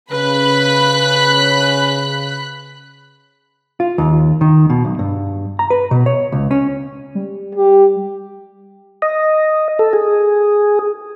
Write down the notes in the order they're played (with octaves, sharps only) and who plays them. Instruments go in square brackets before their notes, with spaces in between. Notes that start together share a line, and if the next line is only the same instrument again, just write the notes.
[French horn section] C#3 [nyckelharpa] B4 [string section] B5 F#6 B6
[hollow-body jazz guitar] F4
D#2
D#3
B2
B1
G2
A#5
B4
B2
C#5
C#2
C#4
[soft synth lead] G3
[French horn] G4
[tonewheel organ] D#5
A4
G#4